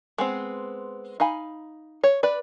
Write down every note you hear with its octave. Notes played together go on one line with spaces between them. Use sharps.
G#3 B3 C4
D#4 F5 G#5 B5
C#5
B4 D5